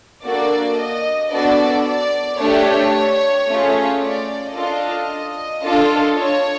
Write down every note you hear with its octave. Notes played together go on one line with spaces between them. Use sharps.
A#3 D4 F#4 A4 D5
D#5
B3 D4 F#4 A4 D5
D5
A3 D4 G4 C#5
A3 C#4 F4 G#4
D5
D4 F4 A4 D#5
D4 F4 A4
C#5